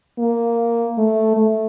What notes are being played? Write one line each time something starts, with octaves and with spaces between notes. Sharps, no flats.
A#3
A3
A3